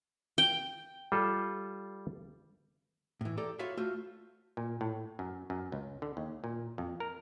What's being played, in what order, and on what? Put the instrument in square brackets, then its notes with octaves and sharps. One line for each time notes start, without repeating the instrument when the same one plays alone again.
[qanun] G5
[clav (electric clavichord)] G3 F4 A4
[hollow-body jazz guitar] A2 E3
G4 A4 D5 A#5
F4 F#4 B4 C#5 E5 F5
A3 F4 F#4 C5 E5
[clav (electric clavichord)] A#2
A2
F#2
F#2
C#2
D3
D#2
A#2
F2
A#4